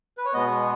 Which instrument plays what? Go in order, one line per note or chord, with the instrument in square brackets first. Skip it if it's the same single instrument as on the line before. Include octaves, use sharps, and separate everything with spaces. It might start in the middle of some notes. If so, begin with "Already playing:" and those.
[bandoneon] B4
C#5
B2 G#3 B3 D#5